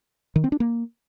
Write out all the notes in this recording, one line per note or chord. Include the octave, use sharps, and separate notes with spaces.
D#3
C4
D4
A#3